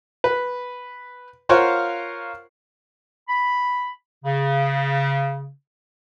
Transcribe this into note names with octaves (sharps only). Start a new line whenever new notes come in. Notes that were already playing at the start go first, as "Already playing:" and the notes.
B4
F4 A#4 C5 C#5 F5 F#5
B5
C#3